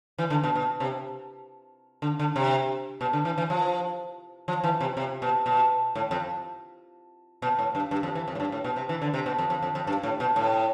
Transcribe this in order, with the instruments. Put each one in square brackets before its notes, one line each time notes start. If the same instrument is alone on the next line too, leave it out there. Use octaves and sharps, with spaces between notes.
[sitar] E3
D3
B2
B2
C3
D3
D3
C3
B2
D3
E3
E3
F3
F3
E3
C3
C3
B2
B2
A2
F2
B2
A2
G2
G2
F2
E3
F2
A2
G2
A2
B2
C3
E3
D3
C3
B2
F2
F2
F2
F2
G2
A2
B2
A2